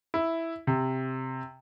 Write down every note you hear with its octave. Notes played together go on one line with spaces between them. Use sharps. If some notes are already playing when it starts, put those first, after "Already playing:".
E4
C3